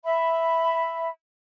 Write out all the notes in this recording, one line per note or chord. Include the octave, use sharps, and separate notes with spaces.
E5 B5